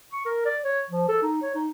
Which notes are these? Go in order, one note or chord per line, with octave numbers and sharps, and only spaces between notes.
C#6
A#4
D5
C#5
F3
A4
D#4
C#5
D#4